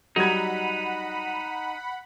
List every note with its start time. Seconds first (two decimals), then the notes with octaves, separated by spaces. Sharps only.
0.16 F#3 G3 D#4 F#5 B5 G#6